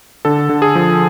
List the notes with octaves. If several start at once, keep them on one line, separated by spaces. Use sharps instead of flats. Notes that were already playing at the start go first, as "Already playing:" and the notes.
D3 A4
D3
G#4
F3